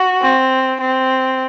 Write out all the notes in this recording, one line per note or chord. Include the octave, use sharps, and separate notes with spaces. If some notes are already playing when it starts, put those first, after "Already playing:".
Already playing: F#4
C4
C4